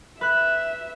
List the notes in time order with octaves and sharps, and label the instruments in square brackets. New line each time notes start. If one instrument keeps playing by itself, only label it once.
[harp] B4 F#6 [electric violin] E5